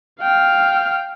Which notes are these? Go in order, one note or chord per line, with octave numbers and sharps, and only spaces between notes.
F5 G5 F6